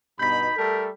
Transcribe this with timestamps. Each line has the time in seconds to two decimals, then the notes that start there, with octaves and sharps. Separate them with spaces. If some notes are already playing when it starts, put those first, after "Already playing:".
0.19 G2 B2 D#4 B5 G6 B6
0.57 G3 A3 A4 A#4